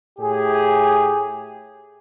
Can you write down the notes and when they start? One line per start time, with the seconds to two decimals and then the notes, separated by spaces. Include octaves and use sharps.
0.19 A2 G4 G#4